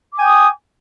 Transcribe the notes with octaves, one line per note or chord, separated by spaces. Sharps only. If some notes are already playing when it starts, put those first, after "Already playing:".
G5 G#5 D6 D#6